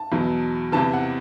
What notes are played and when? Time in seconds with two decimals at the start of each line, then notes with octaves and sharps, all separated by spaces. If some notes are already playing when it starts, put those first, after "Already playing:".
Already playing: A5
0.12 E2 B2 F#3
0.72 E2 C3 E3 A5
0.93 F#5